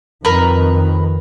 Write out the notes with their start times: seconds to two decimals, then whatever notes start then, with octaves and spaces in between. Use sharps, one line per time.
0.25 F2 D#3 A#4 B4